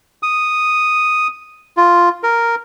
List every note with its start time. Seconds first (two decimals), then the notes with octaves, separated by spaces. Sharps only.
0.23 D#6
1.77 F4
2.23 A#4